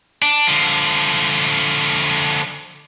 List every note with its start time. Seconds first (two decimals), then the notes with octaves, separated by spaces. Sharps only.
0.22 D4
0.47 D3 F3